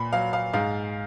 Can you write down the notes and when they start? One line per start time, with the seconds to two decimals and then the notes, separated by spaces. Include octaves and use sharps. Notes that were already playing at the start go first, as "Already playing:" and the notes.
Already playing: A#2 B5
0.13 F#3 F5
0.33 F5
0.53 G#2 F5